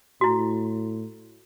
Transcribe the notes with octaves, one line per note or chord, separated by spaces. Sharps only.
A2 E4 F#4